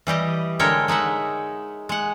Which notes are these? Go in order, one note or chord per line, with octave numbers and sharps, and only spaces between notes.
E3 G3 G4 D#5
D3 G#3 A#4 C#5 E5 G5
G#3 D#4 E5 F#5
G#3 F#5